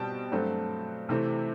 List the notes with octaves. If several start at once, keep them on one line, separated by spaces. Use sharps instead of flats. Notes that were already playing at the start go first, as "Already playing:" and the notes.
Already playing: B2 G3 C4 G5 A5
G2 F#3 A3 C4
C3 E3 A3 C4